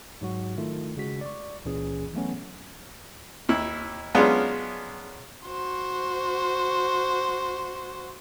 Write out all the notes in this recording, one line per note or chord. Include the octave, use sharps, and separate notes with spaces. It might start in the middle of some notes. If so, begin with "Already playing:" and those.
G#2 F#3 F#4
D#3 A3 E4 F4
C#3 G#3 F#4 B6
D5 C#6
C#2 A#2 E3 C#4 G#4
E3 F#3 A3 B3 C#4
D#2 E4
F#3 G#3 B3 C#4 D4 F4
F#4 C5